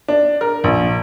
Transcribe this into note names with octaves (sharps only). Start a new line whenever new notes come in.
D4
A#4
A#1